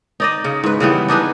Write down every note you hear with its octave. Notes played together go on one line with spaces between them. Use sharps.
D#4 D5 D#5
C#3
G#2 B4
C#3 E3 G3 B3
D4 D#4 G#4 B4